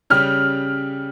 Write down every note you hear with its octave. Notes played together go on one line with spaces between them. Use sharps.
C#3 G3 C#4 G4 F6